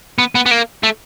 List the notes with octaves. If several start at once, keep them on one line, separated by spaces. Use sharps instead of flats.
B3
B3
B3
A#3
A3